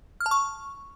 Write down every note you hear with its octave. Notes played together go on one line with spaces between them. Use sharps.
F6
A5
C#6